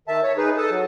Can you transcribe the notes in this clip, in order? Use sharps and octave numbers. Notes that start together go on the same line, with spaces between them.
D#3 E5 A5
C#5
D#4 G#4 B4
A4 A5 D#6
F#3